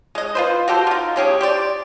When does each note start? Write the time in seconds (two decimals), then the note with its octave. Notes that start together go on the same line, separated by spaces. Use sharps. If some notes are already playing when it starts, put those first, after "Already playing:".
0.15 G#3 D#5
0.35 F4 B4 C5
0.68 F#4 G4 A4 C5
0.87 D#4 F4
1.16 G#3 C#4 G4 G#4
1.41 G4 C5 D5